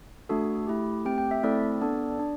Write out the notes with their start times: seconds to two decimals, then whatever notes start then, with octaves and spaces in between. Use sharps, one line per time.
0.29 A3 D4 F#4 A4
0.67 A3 E4 G4
1.05 A3 C4 G4 G5
1.18 G5
1.31 E5
1.43 A3 C4 E4 A4 D5
1.81 B3 D4 A4
2.19 D4